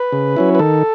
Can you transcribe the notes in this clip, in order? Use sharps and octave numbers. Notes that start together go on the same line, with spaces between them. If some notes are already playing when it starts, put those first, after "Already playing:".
Already playing: B4
C#3
F#3 C#4 E4
B4
D#3 A4